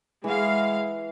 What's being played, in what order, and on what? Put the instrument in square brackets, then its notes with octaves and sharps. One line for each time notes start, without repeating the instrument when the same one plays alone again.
[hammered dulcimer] E3 F#5 [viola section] G#3 F5